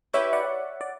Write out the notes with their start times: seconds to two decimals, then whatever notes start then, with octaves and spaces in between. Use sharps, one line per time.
0.14 E4 G4 B4 C#5 E5
0.33 D5 F#5
0.81 D5